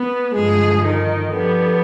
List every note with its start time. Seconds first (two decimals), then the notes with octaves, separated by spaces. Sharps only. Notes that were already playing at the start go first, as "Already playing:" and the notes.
Already playing: B3 B4
0.34 G2 D3 F3 G#3 G#4
0.84 D#3 D#4
1.32 F2 D3 G3 B3